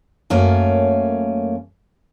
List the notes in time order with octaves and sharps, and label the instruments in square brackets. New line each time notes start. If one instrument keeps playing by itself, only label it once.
[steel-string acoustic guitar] F#2 A3 A#3 C#4